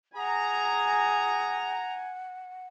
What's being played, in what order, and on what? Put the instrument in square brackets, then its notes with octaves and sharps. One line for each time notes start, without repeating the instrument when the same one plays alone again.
[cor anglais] G#4 [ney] F#5 [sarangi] G#5 [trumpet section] A#5